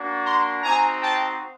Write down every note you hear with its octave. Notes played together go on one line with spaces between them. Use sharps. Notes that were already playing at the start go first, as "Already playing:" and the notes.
Already playing: A#3 D4 F#4
A#5 C6
C4 D#4 F#4 G#5 A#5
G5 A5